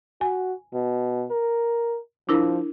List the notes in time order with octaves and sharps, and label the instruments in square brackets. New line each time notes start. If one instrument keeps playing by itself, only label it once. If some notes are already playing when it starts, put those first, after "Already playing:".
[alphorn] F#4 [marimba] G#5
[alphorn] B2
A#4
[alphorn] F3 [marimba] D4 E4 A#4